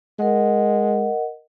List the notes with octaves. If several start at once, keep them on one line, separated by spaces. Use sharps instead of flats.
G#3 A#4 D#5 F#5